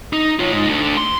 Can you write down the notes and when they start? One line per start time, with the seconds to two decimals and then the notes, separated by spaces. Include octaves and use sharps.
0.13 D#4
0.39 F4 C#5
0.52 G#3 D#4
0.68 D2 D3
0.97 C6